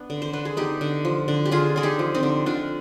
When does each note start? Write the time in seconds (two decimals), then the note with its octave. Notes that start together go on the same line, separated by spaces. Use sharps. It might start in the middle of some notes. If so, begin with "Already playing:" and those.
Already playing: B3 D4
0.10 D3
0.22 C5
0.33 D3 B4
0.45 G#4
0.57 B3 D#4 G4
0.81 D3
1.05 F3
1.28 D3
1.45 G4
1.52 D3 F4 G#4
1.76 D3 G#4
1.83 D#4 G4
1.99 F3
2.15 C4 D#4
2.23 D3
2.46 D3 D4 F4